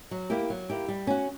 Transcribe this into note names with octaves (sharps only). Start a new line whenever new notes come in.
F#3
A#3 E4 G4
F#3
A#3 E4 G4
G3
C#4 F#4